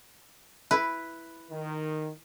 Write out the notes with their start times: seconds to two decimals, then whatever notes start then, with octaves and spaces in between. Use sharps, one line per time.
0.71 E4 B4
1.51 D#3